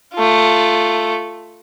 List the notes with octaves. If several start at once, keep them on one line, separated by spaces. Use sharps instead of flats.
A3 F4